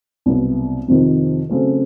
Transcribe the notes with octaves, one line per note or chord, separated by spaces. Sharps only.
C2 B2 F#3 B3
F2 C3 D#3
C#3 F#3 A3 C4